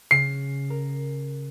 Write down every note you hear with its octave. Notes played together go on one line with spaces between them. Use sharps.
C#3 C7
A#4